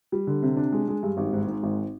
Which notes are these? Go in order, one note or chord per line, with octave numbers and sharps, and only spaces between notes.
G3
D3
C3
D4
G#3
G#3
G2
G#1
G#2
G#2
G#1